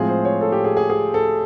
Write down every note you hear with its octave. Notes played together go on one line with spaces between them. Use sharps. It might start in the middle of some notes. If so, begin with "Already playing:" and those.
Already playing: A2 F3 G#3 C4 F4 G#4
C5
C#5
A4
G4
G#4
G#4
G#4
A4